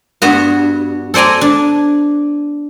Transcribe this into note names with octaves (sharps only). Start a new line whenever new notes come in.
G2 B3 F#4
A4 C5 D5 G#5 A#5
D4